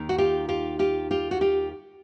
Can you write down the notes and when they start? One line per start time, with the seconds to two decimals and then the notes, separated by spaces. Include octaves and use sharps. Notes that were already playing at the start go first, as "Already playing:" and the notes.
Already playing: D#2 D#3
0.09 F#4
0.18 F4 G4
0.49 F4 G4
0.79 F4 G4
1.11 F4 G4
1.31 F#4
1.41 F4 G4